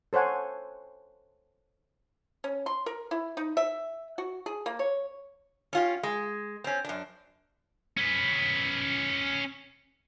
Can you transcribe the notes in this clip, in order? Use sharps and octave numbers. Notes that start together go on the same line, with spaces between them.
A4 C5 C#5 F#5 G#5
C#4
C6
A#4
E4
D#4
E5
F#4
G#4
A#3
C#5
C#4 F4 G4
G#3
C4 C#4
F#2 D4
C#4 B4